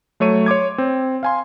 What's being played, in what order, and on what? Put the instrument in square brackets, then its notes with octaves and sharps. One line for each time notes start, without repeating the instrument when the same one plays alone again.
[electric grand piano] F#3 A3 C#5 C#6 D#7
C#5 C6 D6 G#6
C4
F5 G#5 C6